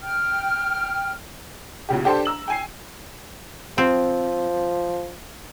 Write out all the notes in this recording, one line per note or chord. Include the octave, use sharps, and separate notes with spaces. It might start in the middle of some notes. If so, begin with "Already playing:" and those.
G5 F6
B1 A#2 C#3 G4
D4 G4 A4 C5 A5
A#5 E6 F#7
G5 G#5 C7
F3 C4